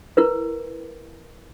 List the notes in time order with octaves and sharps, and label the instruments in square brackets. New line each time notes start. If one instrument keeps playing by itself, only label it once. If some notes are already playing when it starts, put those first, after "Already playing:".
[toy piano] E4 A#4 B4